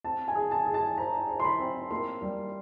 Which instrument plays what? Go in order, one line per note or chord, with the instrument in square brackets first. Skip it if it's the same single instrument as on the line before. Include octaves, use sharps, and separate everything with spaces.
[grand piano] C4 [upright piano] A5
[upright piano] G#5
[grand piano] G#4
[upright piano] A5
[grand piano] G#4
[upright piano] A5
[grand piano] C5 [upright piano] A#5
[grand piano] C5
[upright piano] C6
B5
[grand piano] C4
[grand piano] A#3 [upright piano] C6
[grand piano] G3